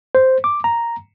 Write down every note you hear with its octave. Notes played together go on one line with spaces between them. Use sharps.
C5
D6
A#5